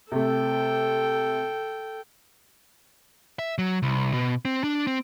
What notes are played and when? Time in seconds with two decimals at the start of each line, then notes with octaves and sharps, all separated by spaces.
0.12 C3 A3 A4 G5
3.39 E5
3.58 F#3
3.83 C2
4.13 B2
4.45 C4
4.64 D4
4.87 C4